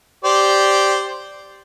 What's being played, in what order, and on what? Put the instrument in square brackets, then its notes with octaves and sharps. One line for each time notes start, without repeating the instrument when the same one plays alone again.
[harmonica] G4 C5 D5